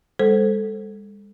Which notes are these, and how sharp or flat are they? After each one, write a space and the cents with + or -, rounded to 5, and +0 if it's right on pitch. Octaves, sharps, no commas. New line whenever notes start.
G#3 -45 A4 +0 C5 +0